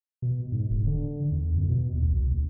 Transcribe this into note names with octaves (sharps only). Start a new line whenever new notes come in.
B2
G#2
D#1
D3
E2
F#2
B2
D#2
C2
D2